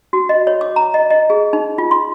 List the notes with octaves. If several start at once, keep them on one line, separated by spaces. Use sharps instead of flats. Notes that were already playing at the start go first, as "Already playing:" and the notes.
F#4
D#5
C#5
D6
A#5
D#5
D#5
G#4
D#4
F4
C6